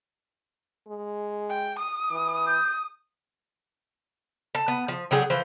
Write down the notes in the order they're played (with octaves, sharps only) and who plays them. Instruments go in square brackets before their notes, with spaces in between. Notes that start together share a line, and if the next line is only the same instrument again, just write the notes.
[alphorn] G#3
[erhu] G5
D#6
[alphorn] E3
[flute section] G6
[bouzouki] A4
B3
F3
D3 F#3 G#4 G5
E3 F3 C5